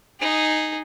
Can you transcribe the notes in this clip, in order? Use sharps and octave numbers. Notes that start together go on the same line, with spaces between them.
D#4 G#4